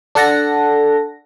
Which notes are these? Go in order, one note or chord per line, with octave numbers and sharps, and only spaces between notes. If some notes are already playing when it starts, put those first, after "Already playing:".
D4 A4 F#5 A5 A#6